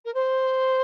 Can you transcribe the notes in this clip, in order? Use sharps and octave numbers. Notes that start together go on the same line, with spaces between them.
A#4
C5